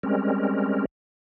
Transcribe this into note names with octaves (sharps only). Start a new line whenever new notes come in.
G3 G#3 C4 C#4 A#4